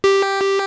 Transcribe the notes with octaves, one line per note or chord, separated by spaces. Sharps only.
G4